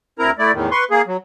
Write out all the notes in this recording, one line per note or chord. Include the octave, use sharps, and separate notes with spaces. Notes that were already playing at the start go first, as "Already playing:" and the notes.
D2 C4 E4 A#4 A#5
A3 E4 D5
E2 A2 D#3
B4 C6 C#6
A#3 G#4
F#3